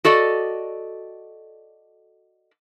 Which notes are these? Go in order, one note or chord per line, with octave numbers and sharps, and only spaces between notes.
F#4 A4 D5 D#5